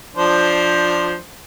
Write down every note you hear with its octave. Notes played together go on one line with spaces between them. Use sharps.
F3 D4 C5